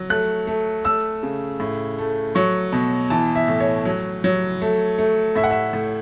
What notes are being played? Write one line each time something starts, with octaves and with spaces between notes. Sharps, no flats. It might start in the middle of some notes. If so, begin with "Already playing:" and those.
Already playing: F#3
A3 F#6
A3
A3 E6
C#3
A2
A3
F#3 C#6
B2
E3 A5
E5
A2
C#5
F#3
F#3
A3
A3
A2 E5
F#5
E5
A2